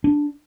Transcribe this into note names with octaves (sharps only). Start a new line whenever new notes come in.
D4